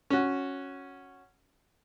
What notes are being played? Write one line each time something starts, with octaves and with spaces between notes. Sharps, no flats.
C#4 F#4